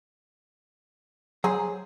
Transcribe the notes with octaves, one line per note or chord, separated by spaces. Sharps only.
F#3 G#4 C5